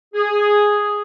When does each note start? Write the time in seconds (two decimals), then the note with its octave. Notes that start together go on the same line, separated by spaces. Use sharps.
0.14 G#4